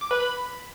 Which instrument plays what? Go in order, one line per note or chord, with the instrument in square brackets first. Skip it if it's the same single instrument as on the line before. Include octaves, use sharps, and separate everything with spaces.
[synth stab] D6
B4
B5